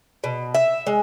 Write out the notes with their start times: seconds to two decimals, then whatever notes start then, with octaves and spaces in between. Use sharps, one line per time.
0.24 B2
0.54 E5
0.87 G#3